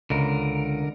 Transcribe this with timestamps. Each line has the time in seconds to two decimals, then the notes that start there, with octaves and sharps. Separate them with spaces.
0.10 C#2 D3 A#4